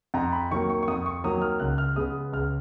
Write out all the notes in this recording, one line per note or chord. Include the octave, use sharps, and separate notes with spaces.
F2 A#5
B5
D#3 F#3 A#3 C#6
C#6
C#6
F2 D#6
C#6
D#3 F#3 A#3 D#6
F6
C#2 F#6
F6
C#3 G#3 B3 D#6
C#2 F6